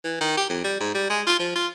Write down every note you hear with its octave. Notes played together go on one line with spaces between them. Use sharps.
E3
D#3
G4
F2
G3
G#2
G3
G#3
F4
F3
F4